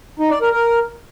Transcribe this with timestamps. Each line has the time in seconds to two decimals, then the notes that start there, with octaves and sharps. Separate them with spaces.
0.19 D#4
0.30 D5
0.41 A#4
0.52 A#4